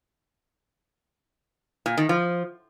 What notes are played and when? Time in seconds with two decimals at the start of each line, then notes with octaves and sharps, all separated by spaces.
1.86 A#2
1.97 D#3
2.09 F3